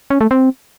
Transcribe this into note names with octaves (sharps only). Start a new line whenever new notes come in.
C#4
A3
C4